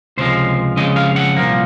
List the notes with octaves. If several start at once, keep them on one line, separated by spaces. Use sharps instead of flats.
C#2 C3 F3 G#3 C5
F2 C#3 G#3 D#5
F5
F#5
C2 A#2 F3 A#3